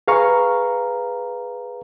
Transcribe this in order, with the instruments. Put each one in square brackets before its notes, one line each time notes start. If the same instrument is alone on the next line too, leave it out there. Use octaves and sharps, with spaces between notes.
[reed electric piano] G#4 B4 F5 A#5 C#6